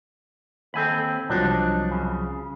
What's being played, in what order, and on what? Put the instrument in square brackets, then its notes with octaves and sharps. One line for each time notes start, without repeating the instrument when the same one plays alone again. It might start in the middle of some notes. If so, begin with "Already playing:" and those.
[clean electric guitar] D#2 C4 [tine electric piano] A4 G#5 B5
[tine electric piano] C2 F3 F#3 [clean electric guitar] D4 D#4
[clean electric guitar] C#3